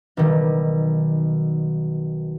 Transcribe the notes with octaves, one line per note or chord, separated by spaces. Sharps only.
B1 D#3 G3